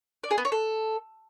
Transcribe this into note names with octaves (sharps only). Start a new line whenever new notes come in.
D5
G#4
B3
C#5
A4